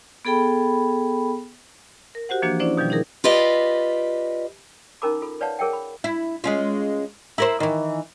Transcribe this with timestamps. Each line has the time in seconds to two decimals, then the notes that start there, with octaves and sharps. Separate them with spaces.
0.25 B3 G#4 A4 G5 B5
2.15 A#4
2.29 F#4 G4 C5 F#5
2.42 E3 F3 A#3 D4 F#4
2.60 C#4 D4 E4 C5 D5
2.77 B2 D#3 F3 G3
2.90 D#4 E4 G#4 A#4
3.24 F4 G4 B4 D5 D#5
5.02 C#4 D#4 A#4 A#5 B5 D6
5.22 F4 A4 B5
5.41 B4 C#5 D5 F5 F#5 A5
5.59 G#4 A#4 C#5 E5 F#5 G5
5.73 B5
6.04 E4
6.44 G#3 C#4 F4
7.38 E4 A#4 C5
7.60 D#3 E3